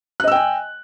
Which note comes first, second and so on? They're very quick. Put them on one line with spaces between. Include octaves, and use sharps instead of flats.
F#6 D#5 E6 G5 G#5